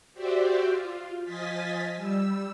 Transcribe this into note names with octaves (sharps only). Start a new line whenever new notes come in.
F#4 G4 C5 D5 E5
F4
F3 F4 D#5 G#5 A6 B6
G3 E6